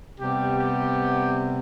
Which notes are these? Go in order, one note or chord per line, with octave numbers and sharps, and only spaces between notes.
C3 G3 B3 G4
G4